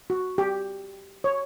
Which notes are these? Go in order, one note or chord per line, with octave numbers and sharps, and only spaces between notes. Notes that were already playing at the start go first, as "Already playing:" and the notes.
F#4
G4
C#5